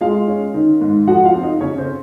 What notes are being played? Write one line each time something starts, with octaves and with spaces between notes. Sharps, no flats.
G#3 F4 F5
C#4
D#3
G#2
F3 F#4 F#5
F4 F5
C4
D#4 D#5
C#3 C#4 C#5
C4 C5